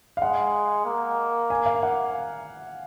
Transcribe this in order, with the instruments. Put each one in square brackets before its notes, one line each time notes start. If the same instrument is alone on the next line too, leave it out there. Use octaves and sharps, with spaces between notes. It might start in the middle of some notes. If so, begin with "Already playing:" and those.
[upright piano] F5
[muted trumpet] G#3 [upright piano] F#5
[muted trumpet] A#3
[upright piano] G#5
F5
F#5